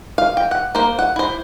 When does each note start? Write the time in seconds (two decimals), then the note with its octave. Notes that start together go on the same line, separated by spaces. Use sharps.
0.18 F5
0.37 G5
0.51 F#5
0.75 A#3 C5
0.99 F#5
1.16 E4 C5